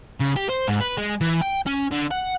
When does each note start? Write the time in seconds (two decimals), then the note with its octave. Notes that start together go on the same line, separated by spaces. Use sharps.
0.20 C#3
0.36 G4
0.49 C5
0.68 G#2
0.80 B4
0.98 G#3
1.21 E3
1.41 G5
1.66 C#4
1.91 D3
2.11 F#5